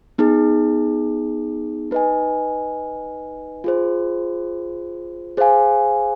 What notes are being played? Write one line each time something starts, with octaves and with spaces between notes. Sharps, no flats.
B3 D#4 G#4
D#4 B4 D#5 G#5
F4 G#4 C5
G#4 C5 F5 G#5